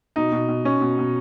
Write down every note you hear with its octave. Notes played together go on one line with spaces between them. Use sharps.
B2 D#4
B2
B2
B2 C#4
B2
B2